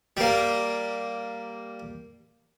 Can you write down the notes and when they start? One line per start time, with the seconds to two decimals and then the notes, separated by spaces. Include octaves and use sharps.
0.17 G3 A#3